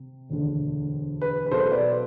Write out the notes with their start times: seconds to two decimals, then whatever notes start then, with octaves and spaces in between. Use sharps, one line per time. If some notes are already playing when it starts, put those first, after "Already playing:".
Already playing: C3
0.30 E1 D2 D3
1.21 B4
1.46 B4
1.51 B1 B2 F#3 A4 C5
1.72 B4 D5